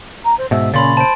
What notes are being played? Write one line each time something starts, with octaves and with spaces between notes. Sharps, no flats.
A#5
C5
G#2 B2 E5
A#2 C#3 C#4 B5 C6 A6
C5 A5 D7